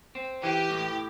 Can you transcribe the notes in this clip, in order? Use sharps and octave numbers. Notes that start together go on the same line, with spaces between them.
C4
E3 G4
A2